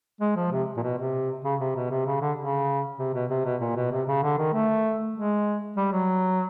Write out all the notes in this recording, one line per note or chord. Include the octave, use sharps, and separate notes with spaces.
G#3
F3
C3
A#2
B2
C3
C#3
C3
B2
C3
C#3
D3
C#3
C3
B2
C3
B2
A#2
B2
C3
C#3
D3
D#3
A3
G#3
G3
F#3